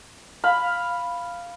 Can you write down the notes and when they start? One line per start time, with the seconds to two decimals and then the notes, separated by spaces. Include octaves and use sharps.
0.44 F5 B5